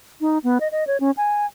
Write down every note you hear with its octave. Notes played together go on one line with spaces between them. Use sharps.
D#4
B3
D#5
D#5
C#5
C#4
G#5